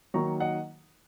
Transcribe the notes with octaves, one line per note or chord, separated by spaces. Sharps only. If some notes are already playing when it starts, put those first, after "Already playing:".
D#3 F#3 A#3 D#4 A#5 C#6
D#5 F#5